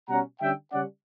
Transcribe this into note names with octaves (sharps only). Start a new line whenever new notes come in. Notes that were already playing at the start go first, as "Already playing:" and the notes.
B2 G3 C#4 F#5 A#5
D3 G3 C#4 E5 G5
C#3 G3 C#4 D5 F#5